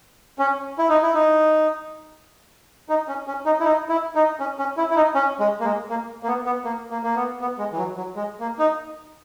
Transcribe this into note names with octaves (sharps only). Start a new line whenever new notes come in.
C#4
E4
D#4
E4
D#4
D#4
C#4
C#4
D#4
E4
D#4
E4
D#4
C#4
C#4
E4
E4
D#4
C#4
G#3
A#3
G#3
A#3
A#3
B3
B3
A#3
A#3
A#3
B3
B3
G#3
E3
F#3
F#3
G#3
A#3
D#4